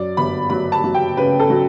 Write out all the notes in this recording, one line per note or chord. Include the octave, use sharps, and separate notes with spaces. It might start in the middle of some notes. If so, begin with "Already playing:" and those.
Already playing: F#2 D5
G1 B5
F#3 B5
A5
F#3
G5
C#3 B4
A4
F#3